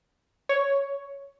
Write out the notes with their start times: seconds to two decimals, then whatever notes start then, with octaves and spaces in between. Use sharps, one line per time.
0.49 C#5